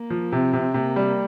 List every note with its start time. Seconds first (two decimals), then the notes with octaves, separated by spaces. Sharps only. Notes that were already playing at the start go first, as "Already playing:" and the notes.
Already playing: A#3
0.10 F3
0.31 C3 C4
0.53 C3
0.74 C3 A#3
0.96 G3